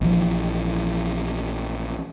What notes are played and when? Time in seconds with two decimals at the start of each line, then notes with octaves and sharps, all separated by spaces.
0.01 A#1 E3 F3